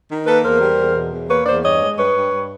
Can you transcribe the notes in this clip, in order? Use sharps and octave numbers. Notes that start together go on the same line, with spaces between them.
D#3
A#3 A4 B4
E2 A#4 C5
G3
E2
B2
E2
A#3 B4 C#5
E2 C5 D5
G2 C#5 D#5
G#3
G2 B4 C#5
G2
G2